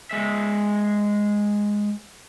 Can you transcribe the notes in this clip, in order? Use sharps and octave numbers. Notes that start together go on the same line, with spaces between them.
G#3 E5